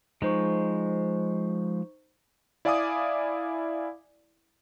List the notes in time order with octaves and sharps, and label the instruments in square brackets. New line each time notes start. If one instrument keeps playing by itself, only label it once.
[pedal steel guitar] F3 G#3 [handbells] D#4 C5 C#6
[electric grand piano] E4 D5 F5 G#5 D6 D#6